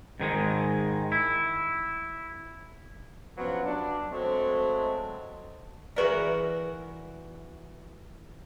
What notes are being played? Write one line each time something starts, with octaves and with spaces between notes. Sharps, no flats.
G#2 D#3 G#3
E4
C3 F3 F#3 B3 C#4
F#3 D4
F#3 G#3 A3 C4
E3 F#4 G#4 A#4 B4 D5